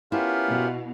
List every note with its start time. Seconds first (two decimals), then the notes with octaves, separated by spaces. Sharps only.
0.12 B3 C#4 E4 F4 G4 A#4
0.50 B2